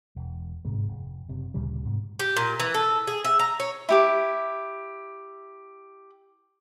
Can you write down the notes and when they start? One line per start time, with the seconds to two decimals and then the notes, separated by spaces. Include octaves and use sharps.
0.16 E1
0.65 G1 G#2 C3 G#3
0.88 F1
1.29 F#1 C3
1.54 D2 A#2 C#3 G3
1.85 G#2 C3
2.19 G4
2.36 A#2
2.60 E3
2.74 A4
3.07 G#4
3.25 E5
3.39 A#5
3.60 C#5
3.89 E4 G4 D6